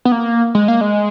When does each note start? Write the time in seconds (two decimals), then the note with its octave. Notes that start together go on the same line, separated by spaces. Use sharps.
0.05 B3
0.12 A#3
0.55 G#3
0.68 A#3
0.81 G#3